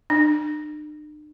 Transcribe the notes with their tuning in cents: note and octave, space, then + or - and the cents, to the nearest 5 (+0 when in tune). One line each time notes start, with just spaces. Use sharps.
D4 +45